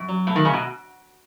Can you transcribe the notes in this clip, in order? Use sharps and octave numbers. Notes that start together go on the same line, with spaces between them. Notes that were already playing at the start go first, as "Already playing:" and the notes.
Already playing: F#2
F#3
B2 A3
D#3
C#3 D#4
B2